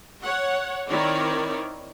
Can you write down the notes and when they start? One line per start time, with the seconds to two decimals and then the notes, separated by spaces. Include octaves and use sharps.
0.23 C#5 F#5
0.89 D#3 C4 E4 A#4 C#5 D5